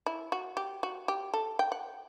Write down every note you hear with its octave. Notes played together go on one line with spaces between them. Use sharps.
E4
F#4
G4
F#4
G4
A4
G5
F#5